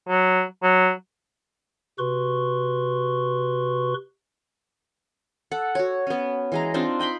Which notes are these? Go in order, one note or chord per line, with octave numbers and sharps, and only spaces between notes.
F#3
F#3
C3 F#4 B4 C6 C#6
A4 F#5
F#4 C#5
B3 C#4
E3 G#3 A#5
C4 D4 D#4 F4
D#5 G5 B5 C6